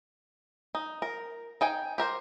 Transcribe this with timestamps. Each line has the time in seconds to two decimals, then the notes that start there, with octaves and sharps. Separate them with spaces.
0.75 D#4
1.02 A#4
1.61 D#4 G5 G#5
1.98 G4 A#4 C5